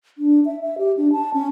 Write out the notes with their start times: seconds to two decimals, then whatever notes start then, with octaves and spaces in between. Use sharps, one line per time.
0.18 D4
0.46 E5
0.61 E5
0.78 G4
0.97 D4
1.12 A5
1.34 C#4